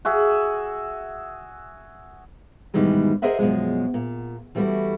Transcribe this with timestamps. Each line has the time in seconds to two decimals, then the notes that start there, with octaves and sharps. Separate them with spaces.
0.05 F#4 G#4 E5
2.74 G#2 B2 D#3 E3 G3 G#3
3.22 G#4 A#4 C5 D#5 E5 F#5
3.39 F#2 B2 F3 G#3
3.94 A#2
4.55 E3 G3 A3 B3 E4 F#4